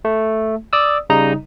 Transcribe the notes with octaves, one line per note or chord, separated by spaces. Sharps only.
A3
D5 D#6 E6
C#3 G3 D#4 D#5 A#5